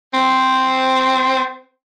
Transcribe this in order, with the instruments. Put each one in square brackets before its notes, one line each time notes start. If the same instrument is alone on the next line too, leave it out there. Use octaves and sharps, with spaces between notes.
[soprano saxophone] C4 [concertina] C5